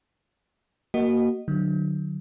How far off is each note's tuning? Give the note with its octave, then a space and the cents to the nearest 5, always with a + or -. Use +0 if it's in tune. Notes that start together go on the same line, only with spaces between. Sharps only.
A#3 +0 F#4 +15 D#5 -10
D3 +30 F#3 -5